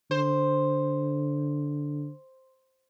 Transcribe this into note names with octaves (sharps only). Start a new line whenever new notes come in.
D3 C5